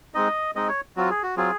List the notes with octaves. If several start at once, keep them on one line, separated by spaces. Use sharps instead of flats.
G#3 C4 D#4 D#5
G#3 C4 D#4 D#5
C#5
F#3 C4 F4 F#4
G#4
F#4
F#3 C4 F4 G#4